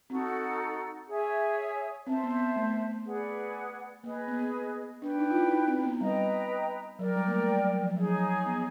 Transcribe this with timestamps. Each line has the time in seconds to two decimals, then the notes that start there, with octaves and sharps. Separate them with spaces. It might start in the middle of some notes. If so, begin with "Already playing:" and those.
0.10 C4 D#4 F#4 A4
1.08 G#4 C#5 E5 G#5
2.07 C4 C5 E5 A5
2.23 B3
2.39 B3
2.56 A3
3.06 G#4 B4 D5 F#5
4.04 A#3 G#4 B4 D#5
4.28 B3
5.02 D4 B4 D5 G5
5.19 D#4
5.30 F4
5.35 E4
5.51 D#4
5.67 C4
5.79 C4
5.84 B3
6.00 G3 B4 D#5 G5 A#5
6.99 F#3 A#4 D5 G5
7.16 G3
7.27 A#3
7.31 A3
7.48 G3
7.64 F#3
7.81 F3
7.97 F#3 D#4 G#4 C#5
8.46 B3